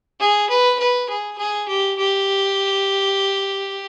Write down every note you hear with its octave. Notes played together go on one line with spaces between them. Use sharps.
G#4
B4
B4
G#4
G#4
G4
G4